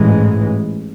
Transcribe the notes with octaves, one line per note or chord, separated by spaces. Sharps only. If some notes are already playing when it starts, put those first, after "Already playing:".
Already playing: A1 G#2 E3 G#3